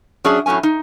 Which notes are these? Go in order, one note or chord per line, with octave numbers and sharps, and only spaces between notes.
F#3 C#4 D4 G#4 E5
A2 F#3 A3 C#4 G#5
D#4